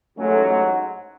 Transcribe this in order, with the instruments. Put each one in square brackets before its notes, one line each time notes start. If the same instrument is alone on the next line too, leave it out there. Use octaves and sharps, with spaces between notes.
[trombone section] A1 G#2 F#3 [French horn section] A3 C#4